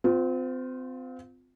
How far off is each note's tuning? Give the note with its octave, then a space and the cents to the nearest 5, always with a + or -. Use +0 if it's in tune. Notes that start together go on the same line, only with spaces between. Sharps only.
C4 -30 F4 +20